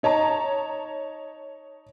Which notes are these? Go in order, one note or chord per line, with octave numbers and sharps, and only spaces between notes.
D#4 C#5 A5 A#5